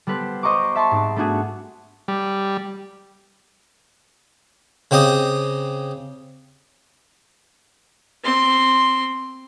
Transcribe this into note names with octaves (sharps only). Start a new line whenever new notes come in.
G3 B3 A4 B4 C5
C5 D#5 A#5 C#6 D6
E5 A5 C6 C#6
G#2 C4
A3 B3 D4 F#4 G#4
G3
C#3 C4 G4 D#5
C4 C6